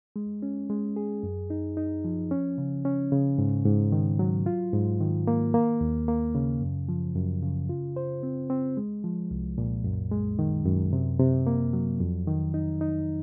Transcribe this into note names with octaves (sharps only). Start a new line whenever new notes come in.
G#3
C#4
G#3
G#4
F#2
D#4
D#4
F3
C#4
C#3
C#4
C#3
G#2
G#2
D#3
F#3
F4
G#2
D#3
A#3
A#3
D#2
A#3
C#3
F#2
F3
F#2
C#3
F4
C5
C4
C4
G#3
F3
C2
A#2
F#2
G#3
D#3
F#2
C3
C3
A#3
F#3
F2
D#3
D#4
D#4